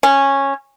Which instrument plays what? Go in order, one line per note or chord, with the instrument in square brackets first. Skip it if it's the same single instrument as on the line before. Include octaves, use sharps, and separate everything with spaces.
[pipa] C#4